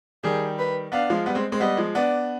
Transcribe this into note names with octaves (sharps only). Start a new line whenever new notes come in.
D#3 G3 G#4
B4
B3 D4 F5
F3 G#3
G3 B3
G#3 C4
G#3 C4
G3 B3 D#5
F3 G#3
B3 D4 D5